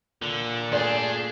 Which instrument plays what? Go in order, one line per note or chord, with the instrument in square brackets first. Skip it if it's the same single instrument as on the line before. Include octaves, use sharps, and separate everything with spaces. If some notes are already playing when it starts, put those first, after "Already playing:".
[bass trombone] A#2 [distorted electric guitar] D3
[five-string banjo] A3 D5 [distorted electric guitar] D4 G4 [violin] G#4